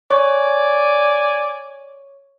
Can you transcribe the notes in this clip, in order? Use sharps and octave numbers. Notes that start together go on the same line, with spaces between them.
C#5 D5 G#5 C#6